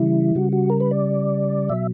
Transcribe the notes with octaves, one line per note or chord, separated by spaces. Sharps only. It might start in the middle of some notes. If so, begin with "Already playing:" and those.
Already playing: C#3 E3 G3 E4
C#3 G3 F#4
F#4
A#4
B4
D5
B2 F#3 E5